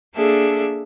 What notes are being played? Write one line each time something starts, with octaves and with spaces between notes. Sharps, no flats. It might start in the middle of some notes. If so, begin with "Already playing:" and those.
A#3 D4 G#4 A4 E5